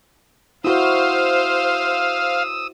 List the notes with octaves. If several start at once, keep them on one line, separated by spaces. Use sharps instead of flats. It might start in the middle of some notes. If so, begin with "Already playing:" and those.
E4 F#4 C5 F5 D#6 E6